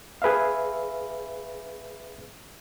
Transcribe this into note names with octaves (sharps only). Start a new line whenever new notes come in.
G#4 B4 E5 F5